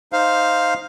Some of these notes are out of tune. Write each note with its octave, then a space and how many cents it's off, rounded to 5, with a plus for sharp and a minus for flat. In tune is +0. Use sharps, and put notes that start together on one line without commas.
D#4 +0 C5 +0 F5 +0